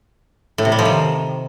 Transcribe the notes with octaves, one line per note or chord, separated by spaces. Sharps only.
A2
C3
G3
F3
D#3